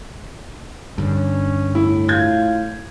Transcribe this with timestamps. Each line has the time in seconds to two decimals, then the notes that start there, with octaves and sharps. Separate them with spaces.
0.98 G2 D3 C#4
1.75 A2 E4
2.09 F4 G6 G#6